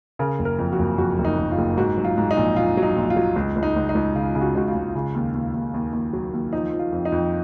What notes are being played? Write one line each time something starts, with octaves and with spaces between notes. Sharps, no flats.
C#3 A#4
F#1
A#4
F2
F#4
F#1
F2 F#4
F#1
D#4
F#1
F4
F#1
G#2 F#4
F#3
F4
G#2
D#4
A#1
A#1 F4
F#3
D#4
A#1
F4
F#3
C#2
C#2
D#4
C#2
D#4
C#2
C#3 F4
C#3
F#4
C#2 F#4
F4
C#2
C#3
D#2
D#2
D#2
D#2
D#2
F#3
D#2
F3 D#4
F3
F4
F2
D#4
F2